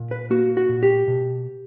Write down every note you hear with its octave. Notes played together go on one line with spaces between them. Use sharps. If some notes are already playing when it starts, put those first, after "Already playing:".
Already playing: A#2
B4
A#3 F#4
F#4
A#2
G4
B2